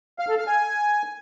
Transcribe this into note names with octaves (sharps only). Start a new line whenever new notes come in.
F5
A4
F5
G#5